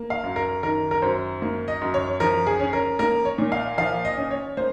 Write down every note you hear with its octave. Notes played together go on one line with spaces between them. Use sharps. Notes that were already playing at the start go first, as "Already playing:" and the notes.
Already playing: A#3
F5
F#2
A#4
D#3 A#4
A#4
F#2 C5
A#3
D#5
F#2
C#5
F3 A#4
G#4
C#4
A#4
A#3 A#4
C#5
A#2
F5
F3 F5
D#5
C#4
C#5
A#3 C5